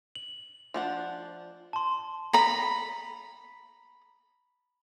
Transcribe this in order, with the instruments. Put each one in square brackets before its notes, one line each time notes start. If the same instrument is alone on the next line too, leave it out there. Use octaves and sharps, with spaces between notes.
[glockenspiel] F#7
[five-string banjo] F3 D4 F#5
[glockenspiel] A5 C6
[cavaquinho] A#5 B5